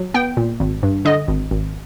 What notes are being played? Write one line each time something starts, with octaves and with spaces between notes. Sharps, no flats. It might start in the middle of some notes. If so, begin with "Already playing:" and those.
Already playing: F#3
B3 G5
A#2
G#1
G2
D3 D#5
G#1
G#1